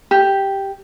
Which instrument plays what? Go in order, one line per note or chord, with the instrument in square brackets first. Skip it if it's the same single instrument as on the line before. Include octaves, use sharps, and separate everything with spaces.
[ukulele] G4